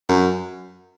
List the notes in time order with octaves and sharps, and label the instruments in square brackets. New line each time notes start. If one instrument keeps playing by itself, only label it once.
[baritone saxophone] F#2